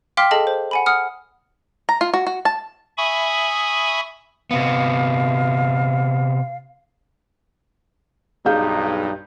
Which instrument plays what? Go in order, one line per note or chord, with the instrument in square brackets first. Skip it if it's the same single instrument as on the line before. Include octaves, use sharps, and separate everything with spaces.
[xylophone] F5 G5 C6 D6 F6 B6
G#4 A4 D#5 F5 A5
C5
F#5 G#5 B5
F#5 D#6 F6
[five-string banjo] A#5
F4
F#4
F#4
A5
[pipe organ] E5 G#5 B5 C#6 D#6
[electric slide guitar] C3 B3 [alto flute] F5
[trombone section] B1 G2 D#4 [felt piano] G#4 F5 G6